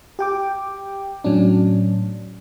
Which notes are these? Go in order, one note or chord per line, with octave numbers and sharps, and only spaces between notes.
G4 G5 D6
A2 F#3 C#4 D4